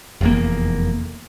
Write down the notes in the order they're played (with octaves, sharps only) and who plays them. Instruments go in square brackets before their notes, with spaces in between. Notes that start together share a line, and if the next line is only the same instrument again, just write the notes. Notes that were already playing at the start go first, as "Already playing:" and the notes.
[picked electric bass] F1 E2 A#3